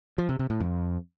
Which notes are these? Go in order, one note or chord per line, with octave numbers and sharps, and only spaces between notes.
F3
C3
C3
A2
F2